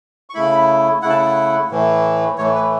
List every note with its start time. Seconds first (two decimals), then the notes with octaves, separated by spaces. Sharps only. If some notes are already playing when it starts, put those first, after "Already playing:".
0.30 C#6
0.34 C#3 A3 E4 B5
1.02 C#3 A3 E4 F#5
1.10 A5
1.18 F#5
1.70 A2 E3 A3
2.38 A2 E3 A3 C#5
2.55 B4